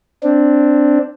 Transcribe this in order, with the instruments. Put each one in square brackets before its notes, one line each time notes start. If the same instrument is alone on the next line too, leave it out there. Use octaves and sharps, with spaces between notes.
[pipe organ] C4 D4